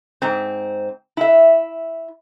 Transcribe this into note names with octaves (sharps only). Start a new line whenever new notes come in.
G#2 C4
E4 E5